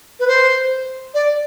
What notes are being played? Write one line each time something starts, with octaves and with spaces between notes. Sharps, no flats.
B4
C5
D5